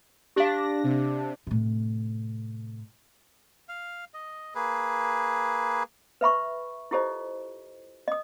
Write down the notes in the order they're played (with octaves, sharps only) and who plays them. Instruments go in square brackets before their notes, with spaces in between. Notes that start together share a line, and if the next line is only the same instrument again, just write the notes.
[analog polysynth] D4 [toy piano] G4 F5 [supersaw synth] A#6
[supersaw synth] C3
[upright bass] A2 C3
[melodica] F5
D#5
A#3 G#4 B4
[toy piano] B4 E5 B5 C#6
E4 F4 G4 A4 C5 D#5
D#5 D#6